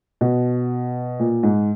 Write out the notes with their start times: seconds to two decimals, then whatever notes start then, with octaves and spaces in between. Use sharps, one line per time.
0.21 B2
1.19 A#2
1.43 G#2